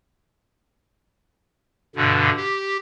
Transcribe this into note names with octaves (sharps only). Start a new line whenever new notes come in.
G2 B2 D3
G4